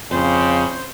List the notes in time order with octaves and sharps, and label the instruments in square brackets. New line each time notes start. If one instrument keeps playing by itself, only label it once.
[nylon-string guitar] F2 [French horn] C#3 [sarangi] C5